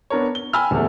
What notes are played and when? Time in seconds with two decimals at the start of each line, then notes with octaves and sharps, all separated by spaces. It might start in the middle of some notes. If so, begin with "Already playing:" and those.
0.10 B3 D4 A#4 C#5
0.35 G7
0.53 G5 G#5 B5 E6 F6
0.71 D#1 E2 A3